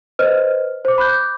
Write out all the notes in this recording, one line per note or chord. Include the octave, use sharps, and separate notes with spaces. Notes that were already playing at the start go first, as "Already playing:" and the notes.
B4 C5 D#5 F6
C5 D6
B5 D6 F#6 G6